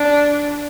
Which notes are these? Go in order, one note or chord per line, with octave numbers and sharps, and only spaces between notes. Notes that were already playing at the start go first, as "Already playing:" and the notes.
Already playing: D4